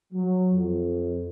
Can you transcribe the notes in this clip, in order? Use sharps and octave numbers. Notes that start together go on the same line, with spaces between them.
F#3
F2